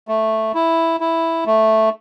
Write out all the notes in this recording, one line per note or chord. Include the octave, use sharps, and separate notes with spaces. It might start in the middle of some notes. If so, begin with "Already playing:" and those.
A3
E4
E4
A3